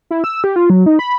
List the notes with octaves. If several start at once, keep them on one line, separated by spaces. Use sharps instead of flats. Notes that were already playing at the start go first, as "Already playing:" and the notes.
E4
E6
G4
F4
F#3
D#4
B5